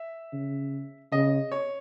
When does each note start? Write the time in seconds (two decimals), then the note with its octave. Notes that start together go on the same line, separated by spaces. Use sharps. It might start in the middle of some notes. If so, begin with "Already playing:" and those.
Already playing: E5
0.33 C#3
1.12 C#3 D#5
1.52 C#5